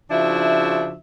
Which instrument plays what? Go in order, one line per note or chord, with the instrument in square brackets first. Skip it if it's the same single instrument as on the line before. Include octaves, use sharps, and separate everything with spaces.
[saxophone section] C#3 F3 D4 E4 F#4 E5